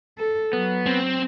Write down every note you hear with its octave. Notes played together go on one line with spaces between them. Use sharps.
A4
F#3 B3
C4